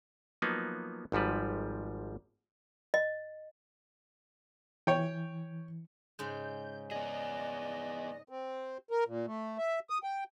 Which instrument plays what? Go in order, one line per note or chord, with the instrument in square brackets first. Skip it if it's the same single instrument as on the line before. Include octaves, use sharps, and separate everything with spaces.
[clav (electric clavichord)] F3 F#3 A#3 B3 D#4
G#1 G#2 F3 G3 B4
[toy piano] D#5
[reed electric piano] E3 [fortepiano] C#5 G5
[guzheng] G#2 C#3 G#3 [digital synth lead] G6
[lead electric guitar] B3 G#4 [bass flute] D5 [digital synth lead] D#5
[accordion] C4
A#4
A#2
A3
E5
D#6
G5